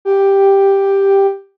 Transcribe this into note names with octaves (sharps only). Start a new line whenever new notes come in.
G4